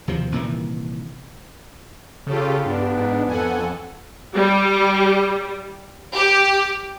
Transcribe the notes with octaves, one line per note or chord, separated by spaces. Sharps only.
D#2 C3 F3
C2 A#2 D#3 E3
C#3 F4 G4 A4
G2 B3 D4
G#2
F2 A4 F#5 G#5
G3
G4